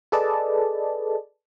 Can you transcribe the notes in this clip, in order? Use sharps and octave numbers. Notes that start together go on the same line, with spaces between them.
G#4 A4 B4 D5 D#5 A5